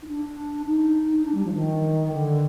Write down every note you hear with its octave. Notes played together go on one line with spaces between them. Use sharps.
D#4
D4
D#4
D4
G3
F3
D#3
D3